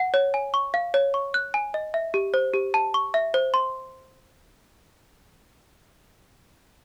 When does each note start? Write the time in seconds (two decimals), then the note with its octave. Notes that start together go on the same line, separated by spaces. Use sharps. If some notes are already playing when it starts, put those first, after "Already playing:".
Already playing: F#5
0.14 C#5
0.34 G#5
0.54 C#6
0.74 F5
0.94 C#5
1.14 C#6
1.34 F#6
1.54 G#5
1.74 D#5
1.94 E5
2.14 G4
2.34 C5
2.54 G4
2.74 A5
2.94 C#6
3.14 E5
3.34 C5
3.54 C6